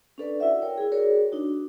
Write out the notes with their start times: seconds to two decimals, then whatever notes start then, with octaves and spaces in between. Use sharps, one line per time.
0.18 C#4 D4 A4 B4 D5
0.40 E4 F#4 B4 D5 E5 F#5
0.62 A#4 C#5 G5
0.78 E4 G#4
0.92 F#4 G#4 A#4 C#5 D5
1.32 D4 D#4 F#4